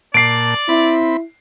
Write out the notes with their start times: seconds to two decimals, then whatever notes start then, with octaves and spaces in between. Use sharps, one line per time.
0.14 A#2 D5 A5 C7 D7
0.69 C4 E4 B5